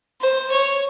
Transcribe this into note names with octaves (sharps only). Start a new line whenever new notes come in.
C5
C#5